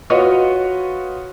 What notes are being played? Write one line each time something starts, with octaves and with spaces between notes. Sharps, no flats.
F4 F#4 B4 C#5 D#5